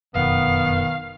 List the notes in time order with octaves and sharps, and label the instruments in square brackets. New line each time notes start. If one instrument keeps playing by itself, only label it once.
[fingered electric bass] F1 F#2 B2 [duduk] D#3 [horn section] B3 [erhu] F5